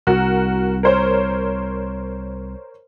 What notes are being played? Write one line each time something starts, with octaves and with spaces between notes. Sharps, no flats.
C2 F#4 A#4
A#4 C5 C#5